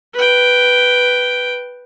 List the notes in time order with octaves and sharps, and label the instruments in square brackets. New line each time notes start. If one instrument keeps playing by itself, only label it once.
[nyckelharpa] B4 G5